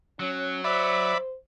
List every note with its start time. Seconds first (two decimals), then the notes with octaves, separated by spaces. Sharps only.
0.20 F#3 C#4
0.64 C5 D5 E5 B5